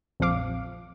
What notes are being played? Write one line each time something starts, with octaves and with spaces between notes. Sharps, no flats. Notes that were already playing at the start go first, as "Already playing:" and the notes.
A#1 F2 F3 F5 D6